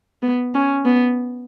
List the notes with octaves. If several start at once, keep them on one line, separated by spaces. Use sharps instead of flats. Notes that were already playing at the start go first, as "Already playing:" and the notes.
B3
C#4
B3